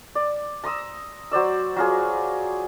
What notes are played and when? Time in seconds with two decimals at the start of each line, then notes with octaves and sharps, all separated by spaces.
0.15 D5
0.64 A#5 C6 D#6 E6
1.31 F#3 C5 D5 E6
1.76 F#3 F4 G#4